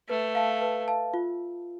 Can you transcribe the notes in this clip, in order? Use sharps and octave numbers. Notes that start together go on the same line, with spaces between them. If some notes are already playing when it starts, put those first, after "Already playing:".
A3 B4
F5 A5
B4
F5 A5
F4